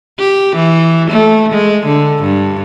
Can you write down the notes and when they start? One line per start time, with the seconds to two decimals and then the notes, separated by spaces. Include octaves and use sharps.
0.19 G4
0.55 E3
1.10 A3
1.52 G#3
1.86 D3
2.23 G2